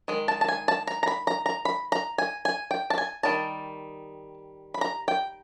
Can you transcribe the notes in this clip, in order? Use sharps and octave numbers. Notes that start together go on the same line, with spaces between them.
D#3 G#3
A5
A5
G#5
A5
A#5
A#5
B5
A#5
A#5
B5
A#5
G#5
G#5
G5
A5
G#5
D#3 G3 A5
B5
A#5
G5